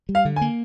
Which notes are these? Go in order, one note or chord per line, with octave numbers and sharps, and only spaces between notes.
G3
F5
D3
G#5
A#3